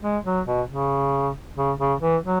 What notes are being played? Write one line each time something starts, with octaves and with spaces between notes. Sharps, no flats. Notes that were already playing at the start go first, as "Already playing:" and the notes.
G#3
F#3
B2
C#3
C#3
C#3
E3
F#3